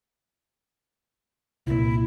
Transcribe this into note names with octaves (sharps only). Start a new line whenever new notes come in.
C2 A#2 E4